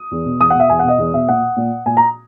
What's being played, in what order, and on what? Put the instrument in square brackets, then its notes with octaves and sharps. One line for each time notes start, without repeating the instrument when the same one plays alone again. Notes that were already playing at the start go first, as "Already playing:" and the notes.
Already playing: [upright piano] D#6
E2
B2
E2 D#6
F#5
B2
E5
E2 G#5
F#5
B2 D#5
E2
B2 E5
A#2 F#5
A#2
A#2 G#5
A#5